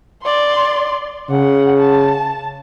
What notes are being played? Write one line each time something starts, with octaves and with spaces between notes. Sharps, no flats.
D5 C6
C#3 F#5
A5